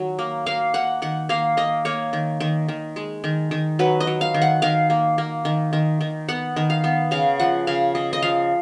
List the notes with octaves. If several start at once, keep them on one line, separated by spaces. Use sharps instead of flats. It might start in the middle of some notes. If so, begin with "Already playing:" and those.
Already playing: D#3 F#3
A#3
A#3 F5
A#3 F#5
D#3 F#5
A#3 F5
A#3 D#5
A#3 C#5
D#3
D#3
D#3
G#3
D#3
D#3
F#3 B4
D#5
F#3
F5
D#3
F#5
D#3 F5
A#3
A#3
D#3
D#3
D#3
B3 F#5
D#3
F5
B3
C#3 F5
F3 F#5
C#3 F5
C#3 D#5
D#5
F3 F5